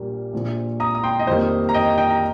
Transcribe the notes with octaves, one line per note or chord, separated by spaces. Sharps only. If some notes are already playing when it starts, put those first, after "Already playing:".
Already playing: A#1 A#2 G3 A#3
A#1 A#2 F3
A#5 D#6
D#6
G5 C6
D#5
F2 D#3 G3 A#3 C5
A#5
D#5 G5
D#5 G5
A#5